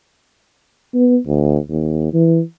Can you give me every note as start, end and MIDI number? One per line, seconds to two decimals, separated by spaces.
0.94 1.17 59
1.27 1.57 38
1.70 2.11 39
2.14 2.41 52